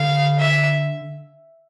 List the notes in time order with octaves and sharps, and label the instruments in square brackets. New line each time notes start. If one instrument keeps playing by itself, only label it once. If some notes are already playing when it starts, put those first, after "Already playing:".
Already playing: [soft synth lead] D3 [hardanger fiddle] F5
[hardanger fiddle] E5